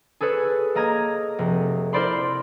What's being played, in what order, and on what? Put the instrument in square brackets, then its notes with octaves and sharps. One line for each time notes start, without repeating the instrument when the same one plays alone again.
[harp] G#4 A4 B4 C#5
A#3 D#5 A#5 G#6
F1
E4 A#4 C5 D5 B5 C6